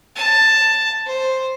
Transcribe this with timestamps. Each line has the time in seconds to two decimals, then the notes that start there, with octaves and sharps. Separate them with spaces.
0.16 A5
1.06 C5